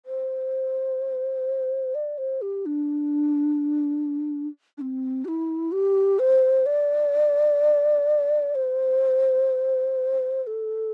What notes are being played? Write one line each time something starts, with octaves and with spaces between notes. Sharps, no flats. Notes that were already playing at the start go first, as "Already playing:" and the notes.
C5
D5
C5
G4
D4
D4
C4
G4
E4
G4
C5
D5
C5
C5
A4